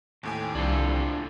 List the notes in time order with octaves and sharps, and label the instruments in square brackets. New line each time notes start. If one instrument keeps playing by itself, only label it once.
[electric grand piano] D#2 A2 G#5 [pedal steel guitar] D#3 C4 G4
[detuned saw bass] C2 [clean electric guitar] D4 F4 A4